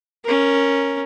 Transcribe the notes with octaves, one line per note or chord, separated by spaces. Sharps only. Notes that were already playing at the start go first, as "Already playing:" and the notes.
C#4 A#4